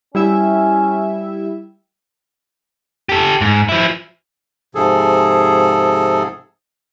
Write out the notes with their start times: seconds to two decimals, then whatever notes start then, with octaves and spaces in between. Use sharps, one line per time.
0.15 G3 C#4 E4 E5
3.09 G4 A4
3.41 G#2
3.69 F3 E4
4.75 G#2 C3 F3 G#4 A4